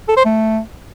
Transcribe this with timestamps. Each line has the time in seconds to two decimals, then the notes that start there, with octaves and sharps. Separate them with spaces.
0.08 A4
0.17 C5
0.25 A3